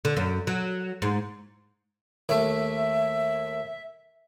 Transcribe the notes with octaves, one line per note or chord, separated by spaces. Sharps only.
D3
F#2
F#3
G#2
D#2 A3 E5